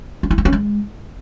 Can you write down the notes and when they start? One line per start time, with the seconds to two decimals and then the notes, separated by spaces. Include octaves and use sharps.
0.23 D4
0.31 E4
0.38 A#3
0.45 C#4
0.53 G#3